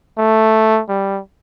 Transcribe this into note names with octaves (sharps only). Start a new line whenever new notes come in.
A3
G3